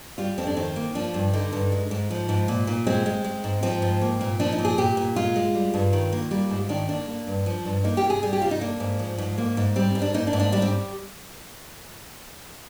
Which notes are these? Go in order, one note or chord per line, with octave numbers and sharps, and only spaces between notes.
G3 F4
F2 C4
D4
D#3 C4
A#3
F3 D4
G2
D3 D#4
G2
G#3
G#2
F3
G#2
A#2
A#2
G#3 C4
G#3
G#3
G#2
F3 C4
G#2
A#3
A#2
F3 D4
D#4
A#2
G#4
A#2 G4
A#2
G#3 F4
G#3
G3
G2
D#3
A#3
G3
G#2
D#3 D4
A#3 D4
A#3
G2
F3
G2
A#3 D#4
G4
C3
G#4
G3 G#4
G4
C3 F4
D#4
A#3 D4
G#2
F3
G#2
A#3
G#2
G3 C4
G#2
D4
A#3 D#4
D4
G#2
D4
G3 D4
C4